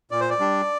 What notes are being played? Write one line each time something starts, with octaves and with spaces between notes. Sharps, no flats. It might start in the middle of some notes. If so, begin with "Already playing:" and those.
A#2 D5
C5
D5
G3 D4